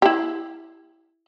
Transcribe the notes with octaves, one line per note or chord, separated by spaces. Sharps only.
E4 G4